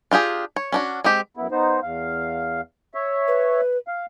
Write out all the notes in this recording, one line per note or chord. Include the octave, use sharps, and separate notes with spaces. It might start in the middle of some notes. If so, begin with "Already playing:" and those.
D4 F4 G4 G#4
C#5
C#4 D4 F#4
G#3 C4 G4
F#2 B3 E4
B3 D#4 C5
E2 F5
C#5 E5
B4
F5